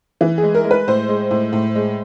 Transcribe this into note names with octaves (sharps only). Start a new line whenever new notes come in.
E3
G#4
G#3
A#4
G#3
B4
A2 C5
G#3
A2
A2
G#3